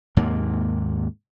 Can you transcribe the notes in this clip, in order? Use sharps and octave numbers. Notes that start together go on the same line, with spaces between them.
D#2 G#2 C3 A#3